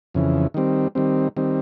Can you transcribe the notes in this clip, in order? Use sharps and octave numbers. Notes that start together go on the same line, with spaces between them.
F2 C#3 E3
D#3 G3 C4
D#3 G3 C4
D#3 G3 C4